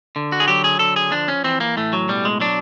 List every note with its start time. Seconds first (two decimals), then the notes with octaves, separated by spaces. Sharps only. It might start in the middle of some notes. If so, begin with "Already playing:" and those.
0.16 D3
0.32 F#4
0.40 G#4
0.48 F#3 G4
0.64 G#4
0.79 D3 A4
0.96 G#4
1.12 F3 D4
1.28 C#4
1.44 E3 C4
1.60 A#3
1.77 A2 A3
1.93 F#3
2.08 B2 G3
2.25 G#3
2.40 F#3 D4